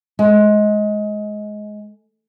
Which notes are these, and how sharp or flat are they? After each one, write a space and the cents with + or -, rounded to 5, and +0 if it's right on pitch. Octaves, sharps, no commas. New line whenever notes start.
G#3 +20